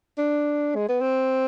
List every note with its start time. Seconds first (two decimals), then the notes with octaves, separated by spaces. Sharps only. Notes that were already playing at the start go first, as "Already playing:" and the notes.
0.18 D4
0.76 G#3
0.89 B3
1.01 C4